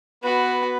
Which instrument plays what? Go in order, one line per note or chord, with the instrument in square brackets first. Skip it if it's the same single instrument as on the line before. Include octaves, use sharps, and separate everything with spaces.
[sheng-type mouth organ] B3 B4 [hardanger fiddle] F#4